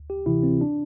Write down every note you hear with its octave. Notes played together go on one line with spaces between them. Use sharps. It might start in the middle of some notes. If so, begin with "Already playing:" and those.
Already playing: D2
G4
C3 E3 E4
C4
D4